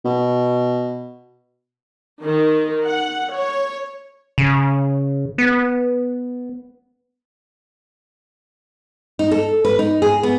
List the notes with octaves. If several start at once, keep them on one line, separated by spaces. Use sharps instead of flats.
B2
D#3
F#5
C#5
C#3
B3
D#4
A4
B4
D#4
G#4
B3